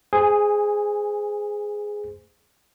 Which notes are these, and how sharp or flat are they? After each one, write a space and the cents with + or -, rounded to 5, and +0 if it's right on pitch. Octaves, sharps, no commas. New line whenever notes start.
G#4 +0 C5 -25 G#5 -20